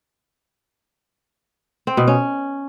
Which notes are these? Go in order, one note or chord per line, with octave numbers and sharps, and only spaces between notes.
C4
B2
C#4